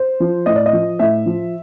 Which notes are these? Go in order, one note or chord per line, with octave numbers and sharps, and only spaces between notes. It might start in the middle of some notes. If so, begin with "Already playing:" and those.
Already playing: C5
F3
A2 D#5
D5
D#5
F3
A2 E5
F3